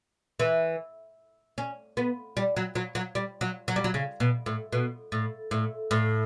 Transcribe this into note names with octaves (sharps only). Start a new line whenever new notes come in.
E3
C#4
B3
G3
F#3
F#3
F#3
G3
F#3
F#3
G3
F#3
C#3
B2
A2
B2
A2
A2
A2